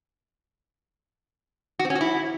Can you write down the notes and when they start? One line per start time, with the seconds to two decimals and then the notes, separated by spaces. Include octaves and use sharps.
1.79 F#4
1.85 C4
1.90 C#4
1.95 F#4
2.01 E4